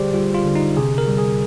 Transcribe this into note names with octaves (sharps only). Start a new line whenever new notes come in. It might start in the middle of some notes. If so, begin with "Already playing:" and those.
Already playing: D3 G3 G4 G#4 C5 D5
G3 F4
F4
D3
D#4
C3 G#4
A#4
G3
G#4